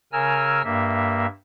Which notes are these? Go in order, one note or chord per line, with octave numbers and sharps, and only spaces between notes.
C#3 A#4 G#5 E6 F6
G2 A#3 E5